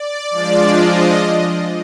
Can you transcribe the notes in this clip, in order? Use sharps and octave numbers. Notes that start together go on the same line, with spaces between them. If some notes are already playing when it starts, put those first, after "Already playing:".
Already playing: D5
F3 G#3 D4 F4 D5
D#5